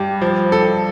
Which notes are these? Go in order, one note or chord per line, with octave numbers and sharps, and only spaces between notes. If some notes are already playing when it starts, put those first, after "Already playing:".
Already playing: G2 G4
F3
A4